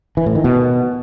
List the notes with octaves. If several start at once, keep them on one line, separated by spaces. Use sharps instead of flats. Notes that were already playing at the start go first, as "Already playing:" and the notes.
E3
A2
D#3
B2